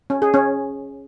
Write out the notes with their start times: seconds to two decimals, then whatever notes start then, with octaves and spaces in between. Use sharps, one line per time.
0.10 C#4
0.22 G#4
0.34 C#4